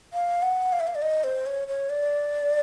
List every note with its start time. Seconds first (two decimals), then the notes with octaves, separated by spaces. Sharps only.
0.13 F5
0.42 F#5
0.72 F5
0.80 E5
0.87 F5
0.95 D5
1.02 D#5
1.24 C5
1.46 C#5
1.68 C#5
1.90 D5